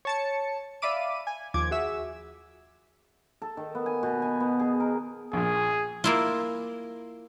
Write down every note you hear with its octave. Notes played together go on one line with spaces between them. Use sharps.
C#5 A5 C#7
D5 E5 F5 B5 D6 D#7
G#5
D#2 F3 D6 G#6
F#4 G#4 E5 E6
A4
D#3
B3
G#5
B2
G#5
B3
G#4
A#4
A#1 A#2 G#4
A#3 E4 F4